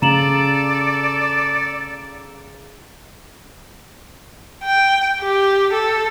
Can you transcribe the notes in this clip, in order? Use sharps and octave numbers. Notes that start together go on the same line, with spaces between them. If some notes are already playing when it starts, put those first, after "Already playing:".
C#3 A4 D5 A#5 E7 F#7
G5
G4
A4